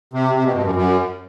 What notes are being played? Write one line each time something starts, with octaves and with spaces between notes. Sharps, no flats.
C3
C3
B2
G2
F#2
F#2